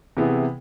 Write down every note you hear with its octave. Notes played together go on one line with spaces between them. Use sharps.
C3 E3 B3 E4 G#4